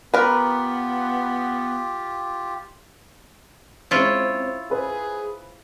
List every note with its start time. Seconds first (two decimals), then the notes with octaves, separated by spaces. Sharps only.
0.14 B3 F4 G4 A#4 B4
3.91 G#3 C4 C#4 E4 F4 C#5
4.71 G#4 B4 C5